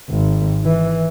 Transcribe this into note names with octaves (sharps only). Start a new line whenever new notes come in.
G#1
E3